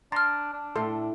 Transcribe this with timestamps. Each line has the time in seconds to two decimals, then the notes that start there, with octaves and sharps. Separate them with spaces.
0.12 D4 A#5 C6 F6 A6
0.53 D4
0.76 A2 A4 C6